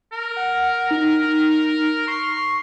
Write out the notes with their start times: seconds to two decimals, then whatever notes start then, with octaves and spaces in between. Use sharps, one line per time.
0.12 A#4
0.36 F#5
0.91 D#4
2.08 C6 C#6